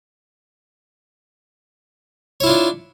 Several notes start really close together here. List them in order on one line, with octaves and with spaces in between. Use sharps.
C#5 E4 F4 D4